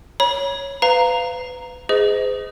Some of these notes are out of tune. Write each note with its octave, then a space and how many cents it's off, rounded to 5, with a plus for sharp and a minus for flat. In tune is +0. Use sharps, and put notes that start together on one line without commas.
C#5 -5 B5 -45
B4 +30 F5 -5 A#5 +0
G#4 +0 C5 -40 D#5 +15